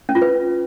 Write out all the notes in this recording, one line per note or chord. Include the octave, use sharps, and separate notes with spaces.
C#4
F4
B4